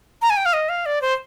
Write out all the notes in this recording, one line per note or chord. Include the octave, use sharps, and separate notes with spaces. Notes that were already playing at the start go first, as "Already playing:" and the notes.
A#5
G#5
G5
F5
D#5
F5
D5
C5